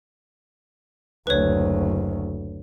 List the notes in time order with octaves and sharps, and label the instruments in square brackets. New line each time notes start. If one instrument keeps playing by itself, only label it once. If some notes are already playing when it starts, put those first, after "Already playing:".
[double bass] F#1 D2 [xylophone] B4 C#5